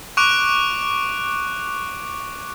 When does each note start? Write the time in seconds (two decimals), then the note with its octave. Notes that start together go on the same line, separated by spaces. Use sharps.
0.17 C#6 D6 F#6 D7 F7